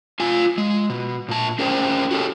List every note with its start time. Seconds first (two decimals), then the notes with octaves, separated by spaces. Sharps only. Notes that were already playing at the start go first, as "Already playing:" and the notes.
0.20 F4 F5 G#5
0.58 G#3
0.90 B2
1.28 A#2 A5
1.59 C#4 G#4 A#4 C5 G5
2.11 F#4 G4 A4 C#5